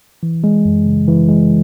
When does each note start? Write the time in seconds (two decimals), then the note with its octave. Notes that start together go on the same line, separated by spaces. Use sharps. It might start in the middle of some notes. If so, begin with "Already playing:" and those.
0.23 E3
0.44 G#3
0.65 F#2
0.86 C#3
1.08 E3
1.29 G#3